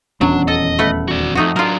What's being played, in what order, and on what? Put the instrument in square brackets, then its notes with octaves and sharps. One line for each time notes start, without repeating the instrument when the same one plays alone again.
[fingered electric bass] D#1 E2 C#4 [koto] F#3 [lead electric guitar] D4
[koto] A4 [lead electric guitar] D#5
[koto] A3 B4 F#5
[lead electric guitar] F#4 D5
[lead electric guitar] F2 [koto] A3 D#4 F#4
[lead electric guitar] F#3 D4 [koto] F4 A#4